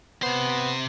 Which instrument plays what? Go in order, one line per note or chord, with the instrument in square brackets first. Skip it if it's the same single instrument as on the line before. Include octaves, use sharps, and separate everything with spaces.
[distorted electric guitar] C3 C5 [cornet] B3